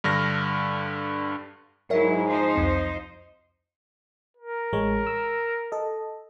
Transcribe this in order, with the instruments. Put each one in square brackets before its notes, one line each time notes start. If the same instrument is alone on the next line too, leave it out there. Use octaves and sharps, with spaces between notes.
[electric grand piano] G2 D3 F6 A#6
[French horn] G#2 [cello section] F#3 E4 [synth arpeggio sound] A#4 C#5 E5
[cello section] F3 D#4 C5
[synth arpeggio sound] C2 F2 C4
[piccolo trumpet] A#4
[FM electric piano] A1 G#3 C#5
E6
A4 D#5